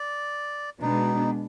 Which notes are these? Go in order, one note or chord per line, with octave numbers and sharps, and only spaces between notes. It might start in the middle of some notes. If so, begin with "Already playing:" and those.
Already playing: D5
B2 G#3 B3 D4 D#4